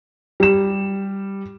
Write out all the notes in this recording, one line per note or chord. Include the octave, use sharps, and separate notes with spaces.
G3 E7